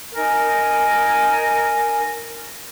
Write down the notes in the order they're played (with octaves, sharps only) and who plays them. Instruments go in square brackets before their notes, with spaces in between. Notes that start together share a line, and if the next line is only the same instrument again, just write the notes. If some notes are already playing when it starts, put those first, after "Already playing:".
[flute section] D#4 A#4 G#5